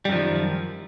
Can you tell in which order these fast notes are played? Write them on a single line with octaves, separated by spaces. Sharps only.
G3 F#2 F3 D#3